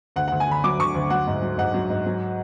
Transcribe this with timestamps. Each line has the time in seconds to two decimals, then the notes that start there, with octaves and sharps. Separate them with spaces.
0.16 D2 F#5
0.28 F#5
0.32 D2
0.40 G#5
0.48 D3 B5
0.64 F#3 D6
0.79 D2 C#6
0.95 D2
1.10 F#3 F#5
1.27 G#2
1.42 F#3
1.58 G#2 F#5
1.74 F#3
1.90 G#2
2.06 F#3